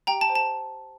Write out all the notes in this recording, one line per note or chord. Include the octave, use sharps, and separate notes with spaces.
G4 G5 A#5
A5
C5 G5
A5